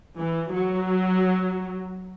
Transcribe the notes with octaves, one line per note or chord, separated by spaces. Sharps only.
E3
F#3